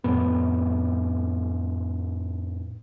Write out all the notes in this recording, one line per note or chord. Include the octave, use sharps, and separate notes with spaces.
F2 A2 B3